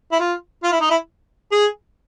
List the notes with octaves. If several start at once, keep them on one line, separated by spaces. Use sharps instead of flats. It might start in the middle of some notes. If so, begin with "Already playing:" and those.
E4
F4
F4
E4
D#4
E4
G#4